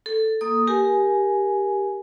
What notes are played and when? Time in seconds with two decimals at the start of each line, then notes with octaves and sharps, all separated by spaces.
0.06 A4
0.41 A#3 A4 D#6
0.67 G4 A#4 G#5